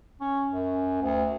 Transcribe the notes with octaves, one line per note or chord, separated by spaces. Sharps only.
C#4
F#2
D2